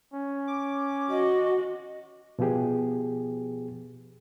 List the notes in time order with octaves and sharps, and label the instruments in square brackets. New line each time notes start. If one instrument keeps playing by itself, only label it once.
[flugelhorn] C#4
[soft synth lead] D6
[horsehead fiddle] F#4 [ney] D#5
[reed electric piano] B2 F3 B3 G4 G#4